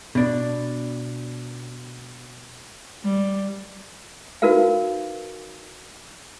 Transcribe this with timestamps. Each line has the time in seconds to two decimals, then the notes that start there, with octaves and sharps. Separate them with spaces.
0.15 B2 D4
3.04 G3
4.42 D#4 F#4 A#4 B4 F5